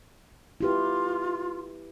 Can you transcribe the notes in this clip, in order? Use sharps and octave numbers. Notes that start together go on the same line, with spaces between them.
E4 F4 G4 B4